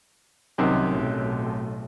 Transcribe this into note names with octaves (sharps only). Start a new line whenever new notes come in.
C2 F#2 C3 D#3
B1 A2